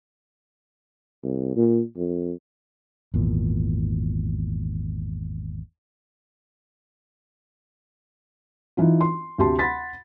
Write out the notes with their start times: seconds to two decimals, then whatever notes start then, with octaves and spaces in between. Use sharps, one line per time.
1.23 C2
1.56 A#2
1.96 F2
3.14 G#1 E2 A#2
8.77 E3 D#4 F4
9.01 C6
9.38 D2 C3 G4 A5 C6
9.59 F#5 B5 C6 A6 B6